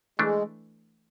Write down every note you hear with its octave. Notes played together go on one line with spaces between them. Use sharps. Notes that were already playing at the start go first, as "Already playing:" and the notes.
E3 G#3 A3 D4